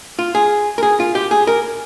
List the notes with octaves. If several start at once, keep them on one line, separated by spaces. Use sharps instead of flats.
F4
G#4
A#4
G#4
F4
G4
G#4
A#4